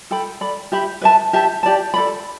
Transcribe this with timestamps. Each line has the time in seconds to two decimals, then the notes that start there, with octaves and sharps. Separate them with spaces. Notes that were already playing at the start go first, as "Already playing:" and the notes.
0.11 A4 G5 B5
0.41 A4 D5 B5
0.72 G4 E5 B5
1.02 B4 E5 A5
1.33 G4 E5 A5
1.63 G4 D5 A5
1.94 A4 D5 B5